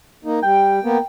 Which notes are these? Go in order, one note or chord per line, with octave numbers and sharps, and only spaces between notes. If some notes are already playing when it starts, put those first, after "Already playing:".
A#3 D#4
G3 G5
A#3 B3